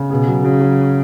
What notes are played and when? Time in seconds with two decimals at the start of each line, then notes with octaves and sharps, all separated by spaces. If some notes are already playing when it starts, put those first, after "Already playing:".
Already playing: C#3
0.10 B2 G#4
0.27 F#3
0.44 C#3 F#3
0.61 F#3